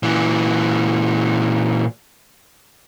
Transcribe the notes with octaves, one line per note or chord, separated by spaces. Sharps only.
A#2 E3